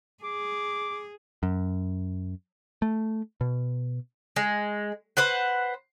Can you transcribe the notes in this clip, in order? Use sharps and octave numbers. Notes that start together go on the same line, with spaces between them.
G#4 D6
F#2
A3
B2
G#3
B4 C5 F#5